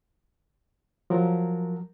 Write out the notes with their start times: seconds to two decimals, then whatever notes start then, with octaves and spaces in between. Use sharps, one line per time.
1.10 F3 F#3 A#4